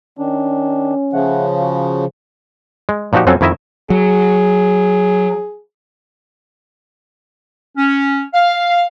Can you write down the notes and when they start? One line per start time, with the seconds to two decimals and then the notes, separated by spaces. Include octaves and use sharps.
0.18 D#3 C#4 D4
1.13 C#3 F3 A3 F#5
1.61 F#4
2.89 G#3
3.13 A#2 F3 D#4 F#4 G4
3.27 F2 F#3 C4 C#4 A4 G#5
3.41 F2 D#3 E4 D#5 E5
3.90 F#3 G#4
7.76 C#4
8.34 F5